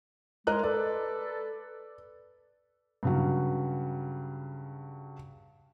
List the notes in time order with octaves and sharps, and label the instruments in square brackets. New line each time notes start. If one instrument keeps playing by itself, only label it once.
[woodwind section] G#3 [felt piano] A#4 D#5 F#6
[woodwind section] A4 B4 [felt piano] D5
[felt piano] G2 C#3 F#3